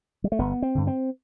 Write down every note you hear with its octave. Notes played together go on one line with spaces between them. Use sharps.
G3
A3
G1 B3
C4
G2 D3
C4